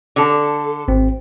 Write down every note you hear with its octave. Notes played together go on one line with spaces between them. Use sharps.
D3 A4
G#1 C4